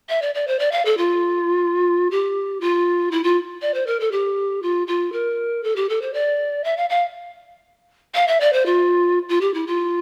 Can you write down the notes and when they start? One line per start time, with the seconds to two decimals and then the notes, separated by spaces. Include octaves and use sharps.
0.09 E5
0.22 D5
0.35 D5
0.47 C5
0.59 D5
0.72 F5
0.85 A4
0.97 F4
2.11 G4
2.60 F4
3.12 E4
3.24 F4
3.62 D5
3.74 C5
3.87 A#4
4.00 A4
4.12 G4
4.62 F4
4.87 F4
5.12 A#4
5.63 A4
5.76 G4
5.89 A4
6.02 C5
6.14 D5
6.64 E5
6.77 F5
6.90 F5
8.15 F5
8.27 E5
8.40 D5
8.53 C5
8.66 F4
9.29 F4
9.41 G4
9.54 E4
9.67 F4